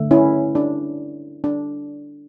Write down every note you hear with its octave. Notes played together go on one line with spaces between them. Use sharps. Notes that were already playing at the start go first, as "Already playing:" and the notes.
Already playing: D3 A3
C#4 E4
D4
D4